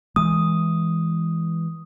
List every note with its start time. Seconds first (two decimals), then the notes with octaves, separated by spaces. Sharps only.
0.16 E3 G#3 D#6